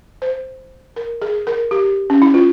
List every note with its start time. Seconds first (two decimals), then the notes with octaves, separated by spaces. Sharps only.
0.22 C5
0.96 A#4
1.22 G#4
1.47 A#4
1.71 G4
2.10 C#4
2.22 E4
2.34 F4